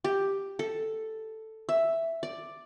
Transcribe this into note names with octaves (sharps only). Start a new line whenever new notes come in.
G4
A4
E5
D5